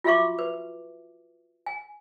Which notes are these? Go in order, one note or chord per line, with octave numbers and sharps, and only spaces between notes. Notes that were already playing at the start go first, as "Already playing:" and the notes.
F4 F#4 E5 F5 C#6 D6
B4
G#5